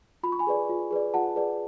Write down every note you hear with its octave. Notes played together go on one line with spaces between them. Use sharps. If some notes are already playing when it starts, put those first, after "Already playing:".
F4 B5
C#6
G#5 B5
G#4 B4 D5
F4
G#4 B4 D5
F4 F#5 A5
G#4 B4 D5